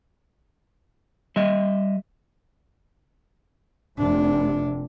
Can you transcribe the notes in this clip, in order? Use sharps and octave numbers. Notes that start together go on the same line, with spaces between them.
G3 D#5 E5
F1 C3 D4